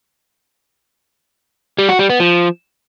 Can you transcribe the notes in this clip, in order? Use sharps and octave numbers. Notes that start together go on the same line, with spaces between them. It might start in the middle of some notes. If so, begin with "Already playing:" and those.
G3
F#4
G3
B3
F3